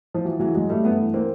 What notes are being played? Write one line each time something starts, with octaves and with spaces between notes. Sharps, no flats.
F3
E3 F#3
C#3 E3 F#3
F#2 F#3 G#3
F#2 G3 A3
G2 A3 B3
E3
A#3 C4